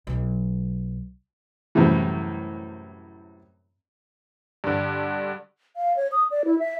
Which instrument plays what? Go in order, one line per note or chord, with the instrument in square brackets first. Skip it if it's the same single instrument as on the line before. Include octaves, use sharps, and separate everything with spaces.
[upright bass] B1 F#3
[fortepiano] F#2 A2 C3 E3 G3
[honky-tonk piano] G2 D3
[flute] F5
C#5
D#6
D5
E4
E5